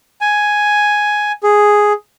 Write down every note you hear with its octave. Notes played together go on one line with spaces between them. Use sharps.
G#5
G#4